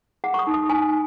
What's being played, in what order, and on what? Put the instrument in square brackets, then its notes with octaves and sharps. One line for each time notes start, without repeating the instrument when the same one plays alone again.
[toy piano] G#4 F#5
C#6
D#6
D#4
D#6
D#4 G#5